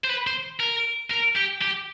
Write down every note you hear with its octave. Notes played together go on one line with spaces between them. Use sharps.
C5
B4
C5
A#4
A#4
G4
G4